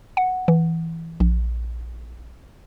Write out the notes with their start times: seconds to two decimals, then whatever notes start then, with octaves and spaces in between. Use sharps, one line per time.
0.17 F#5
0.48 E3
1.20 A#1